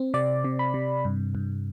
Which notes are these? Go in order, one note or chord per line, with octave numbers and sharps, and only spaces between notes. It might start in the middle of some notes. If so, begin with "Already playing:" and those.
Already playing: C4
C3 D5
C3
B5
C3
G2
G2